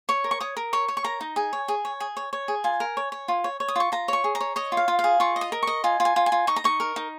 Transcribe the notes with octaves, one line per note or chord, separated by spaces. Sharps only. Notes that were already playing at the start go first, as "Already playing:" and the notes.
C#5 C#6
A#4
C#6
C#5 D#6
A#4
C#5 C#6
C#5
C#6
A#4 A#5
D#4
G#4 G#5
C#5
G#4
C#5
G#4
C#5
C#5
G#4
F4 G#5
A#4
C#5
C#5
F4
C#5
C#5
D#6
F4 C#6
F4 A#5
C#5 C#6
G#4
A#5
C#5
C#5 D#5
F4
F5
F4
F5
G#4
F4 C#6
D#5
D#6
A#4
D#5 C#6
F4 G#5
F4
G#5
F4
G#5
F4
D#4 C#6
A#5
D#4 C#6
A#4
D#4